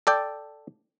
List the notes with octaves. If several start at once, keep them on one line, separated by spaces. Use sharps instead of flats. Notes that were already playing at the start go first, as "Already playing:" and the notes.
A4 D5 G5